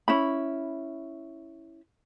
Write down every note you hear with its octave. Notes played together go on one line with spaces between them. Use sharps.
C#4 E4 B5